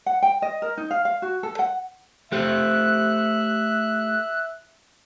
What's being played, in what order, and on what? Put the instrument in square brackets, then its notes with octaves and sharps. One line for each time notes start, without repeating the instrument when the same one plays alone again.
[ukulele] F#5
G5
D#5
A#4
D#4
F5
F5
F#4
A4
F#5
[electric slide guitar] A3 G4 C5 [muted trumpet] E5 [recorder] F#6